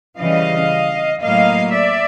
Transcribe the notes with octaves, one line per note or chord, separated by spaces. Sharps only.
C#3 E3 G3 D#5 F5
A2 F#3 A#3 D#5 F5
D5 E5